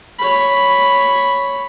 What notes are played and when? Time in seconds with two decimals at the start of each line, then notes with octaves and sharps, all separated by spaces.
0.19 C#5 B5